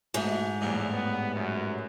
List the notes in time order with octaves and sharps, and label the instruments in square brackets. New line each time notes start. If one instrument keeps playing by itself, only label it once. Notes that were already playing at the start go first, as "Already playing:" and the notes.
[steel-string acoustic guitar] G#2 [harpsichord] B2 A3 A#3
[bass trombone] E2 [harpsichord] A2 G3 A#3
[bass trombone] B3
F#2